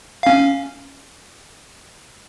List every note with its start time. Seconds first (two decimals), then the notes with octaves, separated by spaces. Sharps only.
0.23 C#4 F5